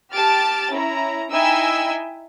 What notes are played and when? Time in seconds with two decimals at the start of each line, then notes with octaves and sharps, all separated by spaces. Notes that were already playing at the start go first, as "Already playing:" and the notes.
0.13 G4 A5 F6 A6 D7
0.72 C#4 E4 A#5
1.31 D#4 E4 E5 G5 G#5 E6